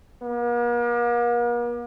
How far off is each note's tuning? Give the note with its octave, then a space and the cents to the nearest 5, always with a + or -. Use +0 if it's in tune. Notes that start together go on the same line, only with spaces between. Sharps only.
A#3 +45